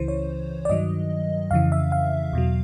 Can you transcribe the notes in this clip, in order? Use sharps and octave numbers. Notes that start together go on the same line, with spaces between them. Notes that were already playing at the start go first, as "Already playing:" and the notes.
Already playing: C#2 C#3 E3 C5
C#5
D5
G2 D#3 F#3 D#5
F2 C#3 E3 F5
E5
F5
E2 B2 F#3